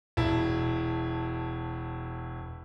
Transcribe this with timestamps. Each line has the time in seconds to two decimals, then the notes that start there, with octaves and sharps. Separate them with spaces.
0.17 E1 E4 A5